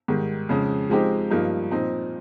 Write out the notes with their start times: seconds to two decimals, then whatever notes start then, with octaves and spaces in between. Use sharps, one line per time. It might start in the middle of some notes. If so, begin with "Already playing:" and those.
0.08 G#2 D#3 G3
0.49 F2 C#3 G#3
0.90 F3 G#3 C4 D#4 G4
1.30 G2 F3 A#3 D#4
1.71 A#2 F3 C4 D#4